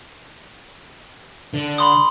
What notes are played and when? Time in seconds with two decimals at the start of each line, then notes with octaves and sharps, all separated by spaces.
1.54 D3
1.78 B5 C6 D#6